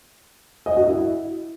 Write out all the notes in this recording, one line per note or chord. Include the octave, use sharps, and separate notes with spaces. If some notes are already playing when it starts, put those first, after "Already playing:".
D#5
F#4
E4